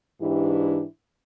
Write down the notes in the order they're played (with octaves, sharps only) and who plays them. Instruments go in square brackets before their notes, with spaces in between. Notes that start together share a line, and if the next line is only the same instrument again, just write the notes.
[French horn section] G#2 E3 D4 E4 G4